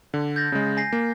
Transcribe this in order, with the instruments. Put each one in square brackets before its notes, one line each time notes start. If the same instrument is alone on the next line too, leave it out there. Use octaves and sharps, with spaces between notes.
[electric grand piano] D3
[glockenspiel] G6 A6 A#6
[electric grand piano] C#3 G#3
[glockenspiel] G#5 A#6 C7
[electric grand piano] A#3